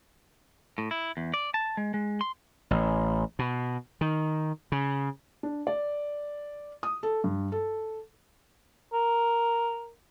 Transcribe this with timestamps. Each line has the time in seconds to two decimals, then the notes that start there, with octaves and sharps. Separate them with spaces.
0.78 A2
0.91 E4
1.17 E2
1.34 D5
1.54 A5
1.77 G#3
1.94 G#3
2.21 C6
2.71 A1
3.39 B2
4.01 D#3
4.72 C#3
5.43 D4
5.67 D5
6.83 D#6
7.03 A4
7.24 G2
7.52 A4
8.93 A#4